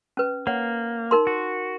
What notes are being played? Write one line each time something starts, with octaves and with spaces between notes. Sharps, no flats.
C#4 B4
A#3 C#5 F#5
D#4 A#4 C6
F#4